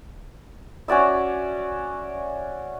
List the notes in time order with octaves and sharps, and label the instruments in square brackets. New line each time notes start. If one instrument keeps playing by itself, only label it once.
[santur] C#4 F#4 D5 E5